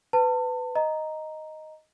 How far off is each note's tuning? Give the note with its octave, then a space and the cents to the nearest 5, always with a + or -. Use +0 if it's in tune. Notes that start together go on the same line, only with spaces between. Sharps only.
B4 +20 A5 +30
D#5 +0 A#5 +0